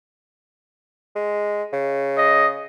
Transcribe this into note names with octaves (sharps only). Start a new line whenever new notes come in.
G#3
C#3
D#5